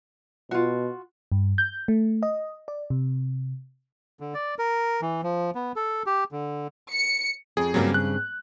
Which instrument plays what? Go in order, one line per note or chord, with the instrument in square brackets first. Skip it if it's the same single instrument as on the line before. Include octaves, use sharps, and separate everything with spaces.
[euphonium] B2 [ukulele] F4 F#4
[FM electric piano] G2
G6
A3
D#5
D5
C3
[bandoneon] D3
D5
A#4
E3
F3
B3
A4
G4
D3
[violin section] C#7
[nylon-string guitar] F2 [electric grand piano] G#4
[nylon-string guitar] G2 C#3 C4 [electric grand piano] F#3 G3 A#3
[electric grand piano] F#6